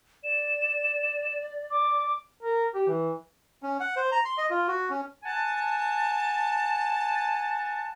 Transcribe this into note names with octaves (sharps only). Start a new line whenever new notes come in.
D5 E7
D6
A#4
G4
E3
C#4
F#5
C5
A#5
C6
D#5
F4
F#4
C#4
F#5 G#5 A5